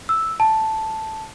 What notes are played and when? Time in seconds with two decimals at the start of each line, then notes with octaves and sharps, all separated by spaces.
0.09 E6
0.40 A5